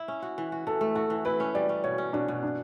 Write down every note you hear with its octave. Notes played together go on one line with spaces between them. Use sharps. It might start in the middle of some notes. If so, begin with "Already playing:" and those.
Already playing: E4
C#4
F#4
E3
F#4
E3 A4
A3
F#4 A4
E3
E4 B4
C#4
G3 D5
C#4
B2 C#5
C#4
B2 D4
B2
D4